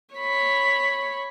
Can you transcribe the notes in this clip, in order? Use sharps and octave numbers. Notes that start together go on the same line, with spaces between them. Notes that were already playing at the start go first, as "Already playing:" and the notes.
C#5 B5